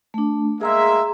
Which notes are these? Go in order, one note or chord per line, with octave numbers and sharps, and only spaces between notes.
A3 D4
G#3 A#3 G#4 E5 A#5 C6